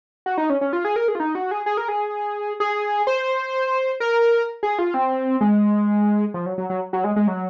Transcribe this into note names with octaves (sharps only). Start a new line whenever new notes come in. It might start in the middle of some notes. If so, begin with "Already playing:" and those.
F#4
D#4
C#4
C#4
F4
G#4
A#4
G#4
F4
D#4
F#4
G#4
G#4
A#4
G#4
G#4
C5
A#4
G#4
F4
C4
G#3
F3
F#3
F#3
F#3
F#3
G#3
G#3
F#3